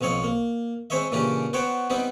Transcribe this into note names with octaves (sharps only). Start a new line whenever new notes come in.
B1 F3 C4 C#5 D#5
A#3
G#3 C4 C5 C#5 D#5 E5
A#2 C#3 E3 C#4 D4 G4
B3 F#4 C5 C#5 G5
G3 B3 C4 D#4 G4